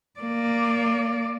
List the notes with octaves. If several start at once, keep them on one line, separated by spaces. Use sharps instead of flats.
A#3 D5